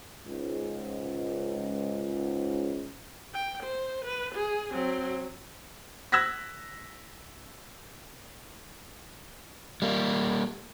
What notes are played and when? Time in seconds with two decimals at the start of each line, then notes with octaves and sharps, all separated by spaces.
0.25 C#2 G#2
3.33 G5
3.63 C5
4.05 B4
4.35 G#4
4.72 F#3 C4
6.12 E6 F#6 G#6 A#6 B6
9.82 G3 A#3